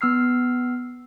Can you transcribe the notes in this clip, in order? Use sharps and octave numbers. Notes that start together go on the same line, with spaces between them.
B3 E6 F6 C7